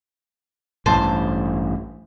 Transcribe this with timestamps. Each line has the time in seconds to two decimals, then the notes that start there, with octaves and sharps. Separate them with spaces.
0.86 A1 G2 C5 A5